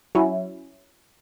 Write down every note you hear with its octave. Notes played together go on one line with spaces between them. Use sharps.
F#3 C#4 E4